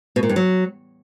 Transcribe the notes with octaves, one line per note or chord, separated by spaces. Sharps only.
B2
A#2
G2
F#3